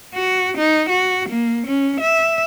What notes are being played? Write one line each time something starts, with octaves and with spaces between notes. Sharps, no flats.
F#4
D#4
F#4
A#3
C#4
E5